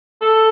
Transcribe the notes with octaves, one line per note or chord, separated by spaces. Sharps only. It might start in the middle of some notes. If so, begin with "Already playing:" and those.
A4